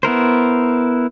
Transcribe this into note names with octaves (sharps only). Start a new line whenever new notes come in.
B3 E4 A#4 C5